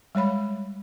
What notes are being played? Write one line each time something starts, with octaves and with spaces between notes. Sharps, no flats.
G3 G#3 C#5 B5